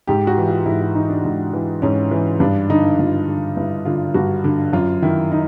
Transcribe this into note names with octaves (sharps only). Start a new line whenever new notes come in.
G#2 G4
F#4
E3
F4
G#2 E4
E4
E3 D#4
D4
G#2
E3
G#2 C#4
E3
G2 D4
D3 D#4
G2 F4
D3
G2 E4
D3 F4
G2 F#4
D3
F#2 F4
D#3 E4
D#4